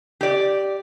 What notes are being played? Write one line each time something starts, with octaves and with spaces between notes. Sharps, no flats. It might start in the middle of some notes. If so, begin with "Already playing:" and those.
G4 D5